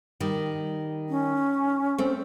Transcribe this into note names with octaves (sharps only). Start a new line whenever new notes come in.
D#3 G3
C#4
A3 C4